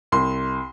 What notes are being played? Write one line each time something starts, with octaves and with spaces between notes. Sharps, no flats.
C2 C6